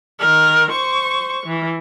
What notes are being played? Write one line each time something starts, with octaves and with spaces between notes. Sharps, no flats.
D#3 A#4
C5 C#6
E3